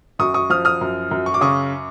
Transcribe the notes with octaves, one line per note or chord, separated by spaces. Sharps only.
F#2 C#6 D#6
C#6 D#6
F3 D#6 F6
D#6 F6
F#2
F#2
C#6
D6
C#3 C#6 D#6